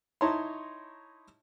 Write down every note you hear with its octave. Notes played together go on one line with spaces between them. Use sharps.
D#4 E4 C#5 A5 A#5 C6